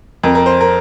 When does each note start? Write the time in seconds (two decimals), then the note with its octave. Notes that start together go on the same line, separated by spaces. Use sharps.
0.23 F2 A#4
0.35 A#4
0.46 C5
0.61 A#4